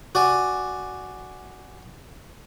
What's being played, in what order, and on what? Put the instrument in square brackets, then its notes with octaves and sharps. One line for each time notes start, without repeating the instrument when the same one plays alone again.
[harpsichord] F#4 D5 G#5